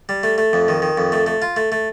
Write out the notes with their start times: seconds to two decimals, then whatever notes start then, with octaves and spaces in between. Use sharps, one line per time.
0.09 G3
0.23 A3
0.38 A3
0.53 F2
0.68 D#3
0.82 D#3
0.97 F2
1.12 A3
1.26 A3
1.42 F4
1.56 A3
1.72 A3